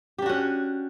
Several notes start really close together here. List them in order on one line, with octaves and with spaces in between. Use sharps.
G4 D4 F#4 C#4